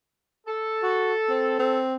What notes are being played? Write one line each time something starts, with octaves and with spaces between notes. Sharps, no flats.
A4
F#4
C4
C4